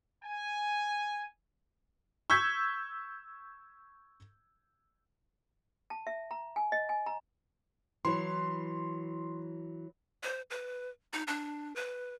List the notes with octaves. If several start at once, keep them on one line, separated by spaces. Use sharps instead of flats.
G#5
C#6 E6 G6 G#6 B6
A5
E5
A#5
G#5
D#5
G#5
A#5
E3 F#3 C6
C5
B4
D#4
D4
B4